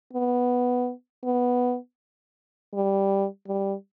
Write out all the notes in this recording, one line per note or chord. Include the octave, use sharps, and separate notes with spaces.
B3
B3
G3
G3